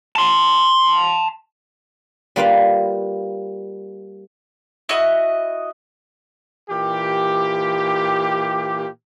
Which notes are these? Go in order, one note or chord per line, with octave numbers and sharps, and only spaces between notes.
A5 C6
G3 A#3 F4 B4 D5 F5
E4 F#4 D#5
A#2 E3 G4